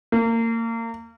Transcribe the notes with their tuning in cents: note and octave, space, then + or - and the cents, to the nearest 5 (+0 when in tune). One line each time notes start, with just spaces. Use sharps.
A#3 -30